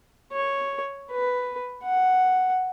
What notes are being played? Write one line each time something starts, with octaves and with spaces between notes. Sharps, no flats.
C#5
B4
F#5